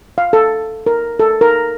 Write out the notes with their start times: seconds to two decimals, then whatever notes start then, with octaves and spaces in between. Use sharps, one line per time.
0.18 F5
0.33 A4
0.86 A#4
1.19 A4
1.41 A#4